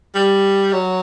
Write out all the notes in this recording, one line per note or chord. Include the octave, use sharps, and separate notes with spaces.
G3
F#3